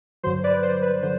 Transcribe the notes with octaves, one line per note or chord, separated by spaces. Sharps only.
G2 D3 F#3 C5
B4 D5
C5
B4
D3 F#3 C5